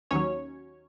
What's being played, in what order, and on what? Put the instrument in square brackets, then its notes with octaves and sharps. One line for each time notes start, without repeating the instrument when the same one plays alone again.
[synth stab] D#2 D#3 F#3 C#4 C#5